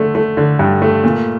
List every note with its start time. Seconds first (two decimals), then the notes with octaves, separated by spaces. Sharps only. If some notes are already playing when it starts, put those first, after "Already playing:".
Already playing: D3 A3
0.15 A3
0.37 D3
0.59 G2
0.82 A3
1.04 A#2